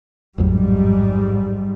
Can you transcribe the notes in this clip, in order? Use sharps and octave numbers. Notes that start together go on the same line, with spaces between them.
A1 F2 G#2 F#3 G3